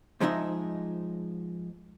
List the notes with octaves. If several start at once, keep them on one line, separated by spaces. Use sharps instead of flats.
G#2 F3 G#3 C#4 D#4 E5